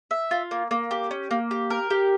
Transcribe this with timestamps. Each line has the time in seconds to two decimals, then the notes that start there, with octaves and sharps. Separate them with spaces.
0.11 E5
0.31 F4
0.51 A#3
0.71 A#3
0.91 G4
1.11 C#4
1.31 A#3
1.51 G4
1.70 A#4
1.90 G4